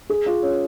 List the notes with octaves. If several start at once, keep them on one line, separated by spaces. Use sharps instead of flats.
G#4
F4
C#4